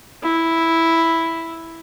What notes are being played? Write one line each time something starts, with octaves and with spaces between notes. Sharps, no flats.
E4